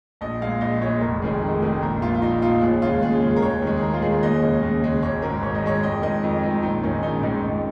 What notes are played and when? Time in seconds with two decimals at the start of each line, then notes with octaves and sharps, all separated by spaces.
0.21 A#1 D#5
0.41 A#2 G#3 F5
0.61 A#1 D#5
0.82 A#2 G#3 C#5
1.01 F1 A#4
1.22 F2 D#3 G#3 G#4
1.42 F1
1.62 F2 D#3 G#3
1.81 A#1 A#4
2.02 A#2 F3 F4
2.15 F4
2.22 A#1 D#4
2.41 A#2 F3 F4
2.62 D#2 G#4
2.82 C#3 G#3 F4
3.02 D#2 G#4
3.22 C#3 G#3
3.36 A#4
3.42 D#2 C#5
3.62 D#3 G#3
3.77 G#4
3.82 D#2 A#4
3.93 F4
4.02 D#3 G#3 G#4
4.23 D#2 D#5
4.42 C#3 G#3
4.63 D#2
4.82 C#3 G#3
5.02 G#1 C#5
5.22 G#2 G#3 A#4
5.42 G#1 C#5
5.55 D#5
5.63 G#2 G#3 C#5
5.83 F2 D#5
6.02 D#3 G#3 D#5
6.23 F2
6.43 D#3 G#3
6.63 A#1 D#4
6.82 G#2 D#3 G#3 C#4
7.03 A#1 D#4
7.23 G#2 D#3 G#3 D#4
7.44 F2